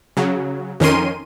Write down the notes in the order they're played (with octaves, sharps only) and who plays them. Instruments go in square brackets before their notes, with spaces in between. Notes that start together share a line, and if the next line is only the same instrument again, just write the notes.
[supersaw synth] C#3 F#3
F2 D#3 C#4 A#4 C6 D#7